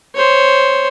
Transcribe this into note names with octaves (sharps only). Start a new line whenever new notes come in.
C5 C#5